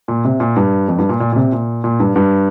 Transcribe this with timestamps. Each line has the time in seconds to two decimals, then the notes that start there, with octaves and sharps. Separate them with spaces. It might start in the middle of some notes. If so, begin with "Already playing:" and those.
0.08 A#2
0.24 C3
0.40 A#2
0.56 G2
0.88 F2
0.98 G2
1.09 A#2
1.20 A#2
1.32 A#2
1.36 C3
1.52 A#2
1.84 A#2
2.00 G2
2.16 G2